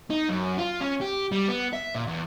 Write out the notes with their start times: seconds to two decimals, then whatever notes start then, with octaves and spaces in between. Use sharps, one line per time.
0.10 D#4
0.29 F#2
0.59 F4
0.81 C#4
1.01 G4
1.32 G3
1.48 B3
1.73 E5
1.95 A#2
2.07 E2